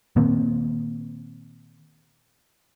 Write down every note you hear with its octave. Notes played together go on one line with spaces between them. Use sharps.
A#2 D#3 A#3 C4